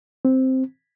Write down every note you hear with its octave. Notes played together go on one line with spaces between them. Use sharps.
C4